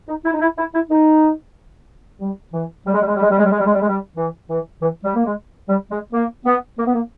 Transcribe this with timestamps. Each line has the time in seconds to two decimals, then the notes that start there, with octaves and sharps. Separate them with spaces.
0.08 D#4
0.25 E4
0.33 D#4
0.41 E4
0.58 E4
0.74 E4
0.90 D#4
2.21 G3
2.53 E3
2.86 G3
2.94 G#3
3.01 G3
3.08 G#3
3.15 G3
3.22 G#3
3.30 G3
3.38 G#3
3.44 G3
3.52 G#3
3.60 G3
3.66 G#3
3.74 G3
3.82 G#3
3.88 G3
4.16 E3
4.50 E3
4.81 E3
5.04 G3
5.15 A#3
5.25 G#3
5.69 G3
5.91 G#3
6.13 A#3
6.45 B3
6.78 A#3
6.86 B3
6.95 A#3